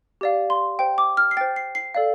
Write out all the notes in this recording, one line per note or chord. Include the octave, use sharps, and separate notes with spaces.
G4 D5 F5
C6
C5 G5
D6
F6
C7
C5 G5 A6
C7
C7
A4 D5 F5